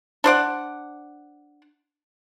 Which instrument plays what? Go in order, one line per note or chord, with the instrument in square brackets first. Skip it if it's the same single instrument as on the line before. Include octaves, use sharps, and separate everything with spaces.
[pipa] D4 C5 D5 F#5